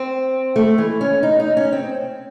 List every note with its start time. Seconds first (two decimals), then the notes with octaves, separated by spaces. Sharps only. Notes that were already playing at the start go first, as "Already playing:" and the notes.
Already playing: C4
0.56 A3
0.78 E3
1.01 C#4
1.23 D#4
1.40 D#4
1.57 C#4
1.73 C4